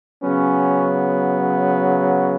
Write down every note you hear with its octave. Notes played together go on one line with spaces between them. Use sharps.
C#3 F#3 B3 C#4